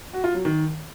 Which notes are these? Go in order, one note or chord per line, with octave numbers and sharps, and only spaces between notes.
F#4
F4
F#3
D#3